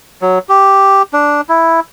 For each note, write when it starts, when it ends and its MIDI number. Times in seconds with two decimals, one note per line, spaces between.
0.22 0.39 54
0.49 1.02 67
1.13 1.41 62
1.49 1.80 64